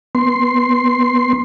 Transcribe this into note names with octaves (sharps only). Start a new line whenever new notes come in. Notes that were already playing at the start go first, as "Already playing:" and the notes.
B3 C6